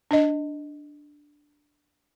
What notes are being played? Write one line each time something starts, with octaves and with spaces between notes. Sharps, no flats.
D4 D#5